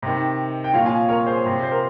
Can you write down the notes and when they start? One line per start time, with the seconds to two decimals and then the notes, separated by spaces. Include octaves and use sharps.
0.02 C3 D#3
0.64 G5
0.73 A#2 F3 C#5 F5
0.85 F5 G#5
1.08 A#4 C#5
1.27 G#4 C5
1.44 C3 F3
1.63 C5
1.72 A#4